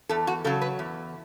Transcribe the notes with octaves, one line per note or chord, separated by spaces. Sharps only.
E2 A4
F#4
C#3 F#3 A4
B4
E2